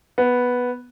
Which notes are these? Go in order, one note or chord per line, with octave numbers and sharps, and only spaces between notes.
B3